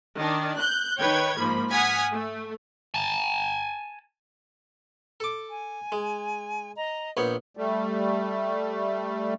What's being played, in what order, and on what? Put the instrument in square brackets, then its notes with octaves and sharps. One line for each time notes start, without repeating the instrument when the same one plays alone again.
[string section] D#3 D4
F#6 G6
D#3 B4 C#5 G5 G#6
G#2 F3 A#3 B5
F#5 G#5 D#6 F6 G#6 B6
A3
[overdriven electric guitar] G#5 A5
[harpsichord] A4 D6
[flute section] G#5
[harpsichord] G#3
[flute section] D#5 A#5
[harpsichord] A#1 B3 C#5 [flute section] G6
[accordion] G3 A3